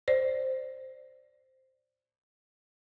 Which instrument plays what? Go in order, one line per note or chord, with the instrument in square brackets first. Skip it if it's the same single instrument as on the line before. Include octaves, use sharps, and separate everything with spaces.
[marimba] C5 D5